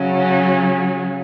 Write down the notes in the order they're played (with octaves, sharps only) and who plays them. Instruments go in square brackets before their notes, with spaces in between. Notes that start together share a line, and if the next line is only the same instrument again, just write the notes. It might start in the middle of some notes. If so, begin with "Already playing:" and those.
Already playing: [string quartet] C#3 F#3 C#4